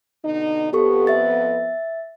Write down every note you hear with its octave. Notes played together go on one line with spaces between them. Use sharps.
B2 D3 D#4
F2 B3 G4 A4 C#6
E5 A6